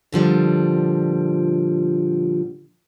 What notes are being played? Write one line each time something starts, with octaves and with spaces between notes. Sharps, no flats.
A#2 D3 F3 G3